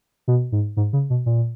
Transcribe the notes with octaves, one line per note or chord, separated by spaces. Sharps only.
B2
G#2
G#2
C#3
B2
A#2